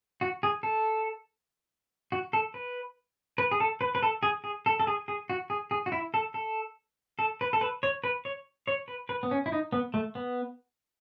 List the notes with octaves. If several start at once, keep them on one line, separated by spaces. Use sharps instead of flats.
F#4
G#4
A4
F#4
A4
B4
B4
G#4
A4
B4
B4
A4
G#4
G#4
A4
A4
G#4
G#4
F#4
G#4
G#4
F#4
E4
A4
A4
A4
B4
A4
B4
C#5
B4
C#5
C#5
B4
B4
B3
C#4
E4
D#4
B3
A3
B3